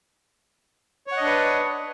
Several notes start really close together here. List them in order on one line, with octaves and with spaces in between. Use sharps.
C#5 F#5 D#5 D4 B4